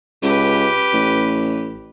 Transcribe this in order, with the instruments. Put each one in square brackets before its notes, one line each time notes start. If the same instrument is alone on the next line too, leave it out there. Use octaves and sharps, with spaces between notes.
[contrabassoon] C#2 [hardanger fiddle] G4 B4
[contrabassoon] A1